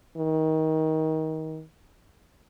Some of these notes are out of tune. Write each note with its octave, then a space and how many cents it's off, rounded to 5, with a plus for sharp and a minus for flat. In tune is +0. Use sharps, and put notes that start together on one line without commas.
D#3 +25